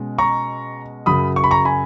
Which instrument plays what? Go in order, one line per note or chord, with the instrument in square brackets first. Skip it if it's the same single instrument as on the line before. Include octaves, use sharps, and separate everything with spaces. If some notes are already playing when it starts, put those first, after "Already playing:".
Already playing: [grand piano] B2 G#3 C#4
A#5 C#6
F#2 C#3 F#3 B5 D#6
C#6
B5
A#5 C#6
G#5 B5